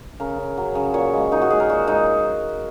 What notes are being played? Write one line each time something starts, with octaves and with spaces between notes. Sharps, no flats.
C#3 A#4
C#3
F#3
C#3
A#2 C#5
G#3
A#2 D#4
F#4
G#3 G#4
A#4
A#2 F#4
G#3 D#4